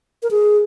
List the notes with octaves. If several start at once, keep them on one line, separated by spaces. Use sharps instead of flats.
A#4
G#4